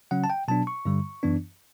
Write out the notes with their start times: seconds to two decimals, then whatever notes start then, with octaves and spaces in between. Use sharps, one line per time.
0.11 C#3 F#3 C#4 F#5
0.24 A5
0.30 G5
0.48 B2 F#3 B3 D4 A5
0.67 C#6
0.85 G2 D3 G3
1.23 F#2 E3 B3 D4